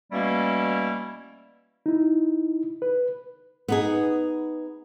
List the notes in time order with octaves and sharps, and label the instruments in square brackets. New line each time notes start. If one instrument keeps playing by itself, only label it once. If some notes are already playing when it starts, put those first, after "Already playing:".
[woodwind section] B2 G3 A3 A#3 C#4 E4
[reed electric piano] D#4 E4
B4
[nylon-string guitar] B3 D#4 G#4